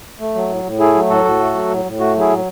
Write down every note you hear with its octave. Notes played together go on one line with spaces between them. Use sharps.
A3
F#3
A2
A2
A3 E4 G#4
F#3
A2 F#4 A4
A2
A3
F#3
A2
A2
A3 F#4
F#3 E4 G#4
A2